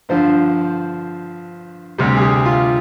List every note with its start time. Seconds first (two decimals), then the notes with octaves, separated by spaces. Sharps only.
0.09 G2 D3 F3 C5
1.98 D2 C3 G3
2.17 G#4
2.22 G4
2.45 F4